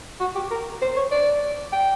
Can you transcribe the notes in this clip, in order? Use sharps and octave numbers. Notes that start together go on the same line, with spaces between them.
F#4
G4
A#4
C5
C#5
D5
G5